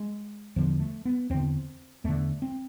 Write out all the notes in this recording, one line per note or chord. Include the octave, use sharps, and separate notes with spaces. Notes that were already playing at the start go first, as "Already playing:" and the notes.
Already playing: G#3
E2 D3 F3
A3
B3
E2 D3 C4
E2 D3 A3
C4